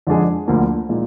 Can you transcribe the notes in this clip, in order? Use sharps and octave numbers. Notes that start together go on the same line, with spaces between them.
F2 D3 G#3 D4 G#4
D2 D3 F3 A#3 D4
A#2 G#3 D#4